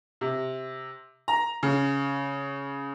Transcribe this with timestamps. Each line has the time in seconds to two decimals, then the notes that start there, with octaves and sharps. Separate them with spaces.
0.21 C3
1.28 A#5
1.63 C#3